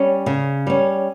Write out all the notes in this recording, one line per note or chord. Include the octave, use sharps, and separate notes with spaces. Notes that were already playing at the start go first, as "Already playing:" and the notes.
Already playing: G3 C#4
C#3
G3 C#4